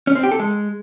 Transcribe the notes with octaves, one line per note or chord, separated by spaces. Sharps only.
C#4
C4
G4
A4
G#3